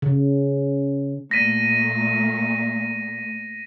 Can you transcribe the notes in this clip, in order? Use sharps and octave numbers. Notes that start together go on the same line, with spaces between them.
C#3
A#2 A3 A#6 B6 D#7